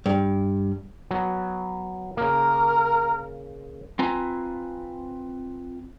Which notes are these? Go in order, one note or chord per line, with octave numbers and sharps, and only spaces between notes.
G2
F#3 B3
C#3 A#3 A#4
C4 F4 B4 G#5 A#5